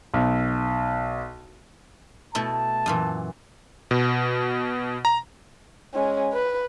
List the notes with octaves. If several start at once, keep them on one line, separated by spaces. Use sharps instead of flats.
B1
B2 A3 E4 A5
F#2 A#2 E3
B2
A#5
G#3 C#4
B4